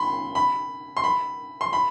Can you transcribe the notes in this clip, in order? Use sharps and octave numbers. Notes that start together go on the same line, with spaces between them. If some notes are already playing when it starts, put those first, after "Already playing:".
Already playing: B5 C6
B5
C6
B5
C6
B5